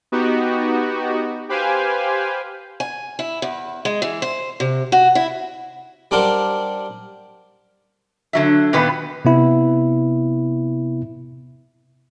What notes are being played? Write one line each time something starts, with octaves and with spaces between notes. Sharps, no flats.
B3 D#4 F#4 G4
G4 B4 C5 F5 G5 G#5
G#5
E4
E2
G#3
E3
C5
C3
F#4
E4
G3 D4 A#4 C5 F#5
D3 F#3 E5
A#2 D#3 B3 B4
C3 B3 E4